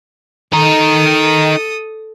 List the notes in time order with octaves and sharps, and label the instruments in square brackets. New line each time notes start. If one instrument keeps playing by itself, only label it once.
[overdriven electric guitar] D#4 A#4 [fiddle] A4 D#6